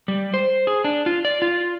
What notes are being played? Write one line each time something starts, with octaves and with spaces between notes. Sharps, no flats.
G3
C5
G#4
D4
F4
D5
F4